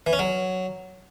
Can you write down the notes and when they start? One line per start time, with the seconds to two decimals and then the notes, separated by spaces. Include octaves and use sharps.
0.07 E3
0.13 C#4
0.19 F#3